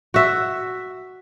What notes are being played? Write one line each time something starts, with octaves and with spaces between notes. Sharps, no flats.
F#4 E5